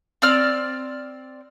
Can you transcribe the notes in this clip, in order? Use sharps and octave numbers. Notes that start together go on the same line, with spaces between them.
C4 D5 F6